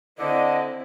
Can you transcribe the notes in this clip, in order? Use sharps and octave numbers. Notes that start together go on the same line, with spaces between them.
D3 C4 E4 D#5